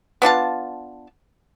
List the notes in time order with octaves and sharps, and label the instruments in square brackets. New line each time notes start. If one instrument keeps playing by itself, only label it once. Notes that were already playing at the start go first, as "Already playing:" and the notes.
[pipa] B3 D4 F4 A5